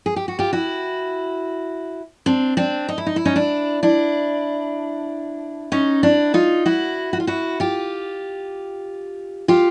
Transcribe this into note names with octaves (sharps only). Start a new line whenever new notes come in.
G#4
G4
F#4
F4 G4
E4 F#4
C4 D4
C4 D4
D#4
E4
D#4
E4
C#4 D#4
D4 E4
D4 E4
C#4 D#4
D4 E4
D#4 F4
E4 F#4
F#4
F4
E4 F#4
F4 G4
F4 G4